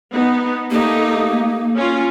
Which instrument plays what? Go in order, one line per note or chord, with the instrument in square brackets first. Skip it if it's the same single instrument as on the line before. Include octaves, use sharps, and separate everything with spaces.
[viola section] B3 D#4
[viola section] A3 D#4 G4 [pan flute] A#3
[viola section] C#4 F4